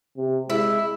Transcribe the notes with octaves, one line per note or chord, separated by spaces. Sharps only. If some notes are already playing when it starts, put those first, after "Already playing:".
C3
G#3 E4